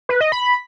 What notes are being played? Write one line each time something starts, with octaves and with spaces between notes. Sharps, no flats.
B4
D#5
B5